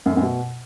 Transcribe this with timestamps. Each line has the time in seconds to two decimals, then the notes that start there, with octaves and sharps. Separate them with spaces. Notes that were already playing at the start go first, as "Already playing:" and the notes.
0.06 F#2
0.11 F2
0.17 F#2
0.22 B2